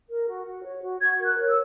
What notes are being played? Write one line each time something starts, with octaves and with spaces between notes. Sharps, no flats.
A#4
F#4
F#4
C#5
F#4
F#4 G#6
A#4 G#6
F#6
C#5
E6